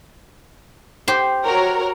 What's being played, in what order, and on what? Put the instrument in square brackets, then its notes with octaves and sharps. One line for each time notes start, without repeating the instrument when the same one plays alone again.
[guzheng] G4 C5
[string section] F#4 A#4 C#5